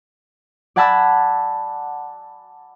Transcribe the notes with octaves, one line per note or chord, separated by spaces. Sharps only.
D5 F#5 G#5 A5 B5 E6